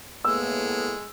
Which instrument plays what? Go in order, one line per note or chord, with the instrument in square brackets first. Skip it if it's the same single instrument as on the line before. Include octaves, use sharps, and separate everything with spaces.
[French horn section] A2 A#3 B3 [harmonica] G#3 [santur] E6